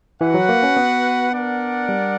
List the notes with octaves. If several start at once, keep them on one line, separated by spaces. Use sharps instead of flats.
E3 F#4 B4 F#5
F#3
A#3
C#4
B3
D4 A#4 D5 F#5
G3